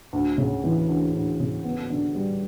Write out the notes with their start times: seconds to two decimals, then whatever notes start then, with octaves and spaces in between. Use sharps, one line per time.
0.13 D2
0.38 C#3
0.64 E3
0.89 D2
1.14 D2
1.40 C#3
1.64 B3
1.90 D3
2.15 G3